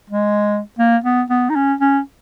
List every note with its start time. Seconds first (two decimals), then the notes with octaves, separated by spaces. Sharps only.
0.10 G#3
0.79 A#3
1.04 B3
1.30 B3
1.50 D#4
1.56 C#4
1.81 C#4